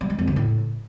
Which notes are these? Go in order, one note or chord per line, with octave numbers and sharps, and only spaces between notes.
G3
G#3
F2
C#3
A2